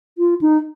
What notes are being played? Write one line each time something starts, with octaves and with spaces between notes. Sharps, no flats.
F4
D#4